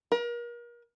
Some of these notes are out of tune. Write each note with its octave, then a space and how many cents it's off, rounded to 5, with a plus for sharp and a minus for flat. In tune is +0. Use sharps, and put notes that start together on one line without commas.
A#4 +35